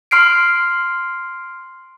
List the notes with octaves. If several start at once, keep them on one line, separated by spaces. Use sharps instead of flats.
C6 F6 C7 D7